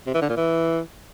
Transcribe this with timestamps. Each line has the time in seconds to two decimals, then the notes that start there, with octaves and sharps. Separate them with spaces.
0.06 C3
0.14 E3
0.22 D3
0.29 A#2
0.37 E3